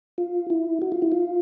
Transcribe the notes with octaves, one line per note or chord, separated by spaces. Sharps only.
F4
E4
F#4
F4
E4
F4